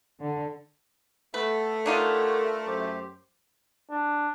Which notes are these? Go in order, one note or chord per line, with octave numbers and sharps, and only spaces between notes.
D3
A3 B3 B4
D4 D#4 F4 G4 A#4 C#5 F#5
F#2 G4 C5
D4